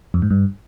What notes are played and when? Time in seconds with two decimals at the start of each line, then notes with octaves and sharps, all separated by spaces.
0.14 F2
0.22 G#2
0.30 G2